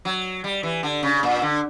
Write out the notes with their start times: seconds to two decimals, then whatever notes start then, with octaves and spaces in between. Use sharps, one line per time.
0.05 F#3
0.44 G3
0.63 E3
0.83 D3
1.03 C#3
1.23 A#2
1.42 D3